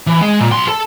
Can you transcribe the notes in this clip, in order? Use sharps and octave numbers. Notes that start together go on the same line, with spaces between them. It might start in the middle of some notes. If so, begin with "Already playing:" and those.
E3
G#3
A#2
B1 C6
A4